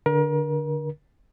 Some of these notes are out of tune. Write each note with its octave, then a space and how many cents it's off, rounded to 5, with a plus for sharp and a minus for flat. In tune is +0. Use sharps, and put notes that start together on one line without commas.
D3 +0 A#4 +35